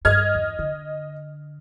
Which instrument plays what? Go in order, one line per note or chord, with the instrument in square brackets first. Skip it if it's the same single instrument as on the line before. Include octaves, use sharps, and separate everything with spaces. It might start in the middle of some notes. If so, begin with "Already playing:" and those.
[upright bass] G2 [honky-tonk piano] D#5 F6 G#6
[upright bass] E2
D3